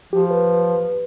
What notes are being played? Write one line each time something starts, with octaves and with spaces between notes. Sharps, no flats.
F3 G4
B4